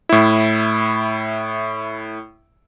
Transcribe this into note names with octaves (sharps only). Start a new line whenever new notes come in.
A2 E4